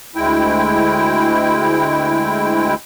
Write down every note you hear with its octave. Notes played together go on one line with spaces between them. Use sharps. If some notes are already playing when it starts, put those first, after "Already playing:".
D2 G#3 E4 G5